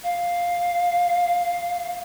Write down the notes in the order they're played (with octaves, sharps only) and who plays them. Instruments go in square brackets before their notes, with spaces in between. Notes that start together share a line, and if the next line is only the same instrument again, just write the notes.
[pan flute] F5